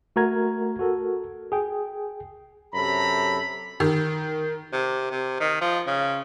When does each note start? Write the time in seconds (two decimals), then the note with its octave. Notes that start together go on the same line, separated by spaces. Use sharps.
0.16 A3 F#4 A#4 A#5 G#6
0.79 F#4 A4 A#4
1.52 G#4 G5
2.74 F#2 C3 A4 A#5 B5
3.80 D#3
4.73 C3
5.11 C3
5.40 D#3
5.61 F3
5.87 C#3